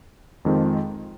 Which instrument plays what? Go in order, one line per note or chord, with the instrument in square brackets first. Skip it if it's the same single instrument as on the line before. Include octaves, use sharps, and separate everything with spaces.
[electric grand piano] F2 D#3 G#3 C4 F4